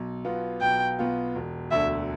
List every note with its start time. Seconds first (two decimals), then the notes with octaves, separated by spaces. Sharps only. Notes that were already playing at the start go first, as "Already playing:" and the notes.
Already playing: B1
0.25 B2 B3 F4
0.61 B1 G5
0.99 B2 B3 F4
1.35 E1
1.71 D2 D3 E5